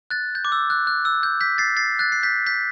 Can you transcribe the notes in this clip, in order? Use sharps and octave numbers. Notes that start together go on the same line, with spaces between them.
F#6 A6
G6
D6
E6
F#6
F#6
E6
G6
G6 B6
A6 C7
A6 C7
F#6 A6
C7
G6 B6
G6 B6